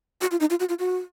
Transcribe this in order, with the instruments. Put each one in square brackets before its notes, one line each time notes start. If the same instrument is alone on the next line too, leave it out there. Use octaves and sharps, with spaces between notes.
[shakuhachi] F#4
F4
D#4
F4
F#4
F4
F#4